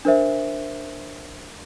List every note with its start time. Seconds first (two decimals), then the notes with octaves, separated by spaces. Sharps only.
0.05 D4 A#4 C5 E5